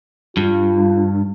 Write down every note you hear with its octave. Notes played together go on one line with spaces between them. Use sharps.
G2 F4